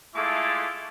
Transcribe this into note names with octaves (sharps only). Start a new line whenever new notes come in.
G#3 A3 E4 F4 A4 D6